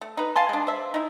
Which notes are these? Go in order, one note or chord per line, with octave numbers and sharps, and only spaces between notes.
A3
D#4 B4
F5 G#5 A5 C6
G#3 D4
C5 E5
D#4 E4